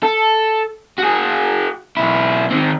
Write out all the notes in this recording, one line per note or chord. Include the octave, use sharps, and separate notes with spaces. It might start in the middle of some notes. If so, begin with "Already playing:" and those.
A4
F#4 G#4
B1 E4
D#3 C4